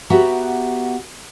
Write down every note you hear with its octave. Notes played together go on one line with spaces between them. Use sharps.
B3 F#4 G4 E5 F#5 A#5